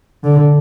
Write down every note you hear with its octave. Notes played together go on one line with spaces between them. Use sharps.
D3